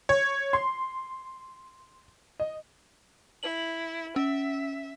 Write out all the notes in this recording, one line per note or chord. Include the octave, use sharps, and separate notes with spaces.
C#5
C6
D#5
E4 F#7
C#4 E5